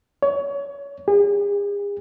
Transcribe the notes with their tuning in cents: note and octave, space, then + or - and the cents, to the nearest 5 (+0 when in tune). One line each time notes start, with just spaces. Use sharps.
C#5 +25
G#4 -40